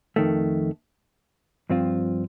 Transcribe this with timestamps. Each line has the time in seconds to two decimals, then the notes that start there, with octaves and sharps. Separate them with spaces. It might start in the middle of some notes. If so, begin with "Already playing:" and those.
0.16 F2 D#3 A3
1.70 G2 F3 C4 F4